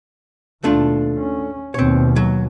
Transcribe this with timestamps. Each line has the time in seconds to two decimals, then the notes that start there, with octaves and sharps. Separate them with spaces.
0.64 D#2 B2 A3 D4 F4
1.20 C#4
1.74 D#2 B2 C4 C#5
2.16 F#3